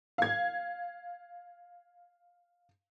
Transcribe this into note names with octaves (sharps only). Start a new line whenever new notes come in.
F5 G#6